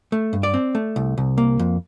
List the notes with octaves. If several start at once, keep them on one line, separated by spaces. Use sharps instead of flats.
A3
G2
D5
C4
A3
C2
C2
A#3
F2